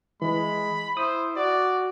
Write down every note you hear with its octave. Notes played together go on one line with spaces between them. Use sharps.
E3 G#3 B5
E4 C5 D#6
F#4 D5